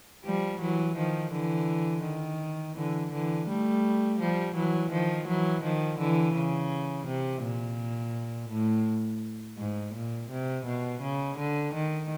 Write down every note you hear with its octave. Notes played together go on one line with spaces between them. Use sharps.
F3 G3
E3 F#3
D#3 F3
D3 E3
D#3
D3 E3
D3 E3
G3 A3
F3 G3
E3 F#3
D#3 F3
E3 F#3
D#3 F3
D3 E3
C#3
C3
A#2
A2
G#2
A#2
C3
B2
C#3
D3
D#3